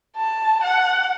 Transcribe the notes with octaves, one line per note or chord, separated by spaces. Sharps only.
A5
F#5